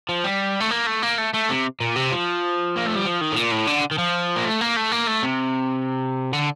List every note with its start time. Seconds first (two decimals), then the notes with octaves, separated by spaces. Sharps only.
0.09 F3
0.24 G3
0.60 A3
0.71 A#3
0.86 A3
1.02 A#3
1.18 A3
1.33 A3
1.49 C3
1.80 A#2
1.96 C3
2.12 F3
2.76 A#3
2.86 A3
2.95 G3
3.05 F3
3.21 D#3
3.32 A2
3.36 A#2
3.52 A2
3.67 D3
3.91 D#3
3.98 F3
4.36 A#3
4.45 A3
4.61 A#3
4.77 A3
4.92 A#3
5.08 A3
5.24 C3
6.33 D3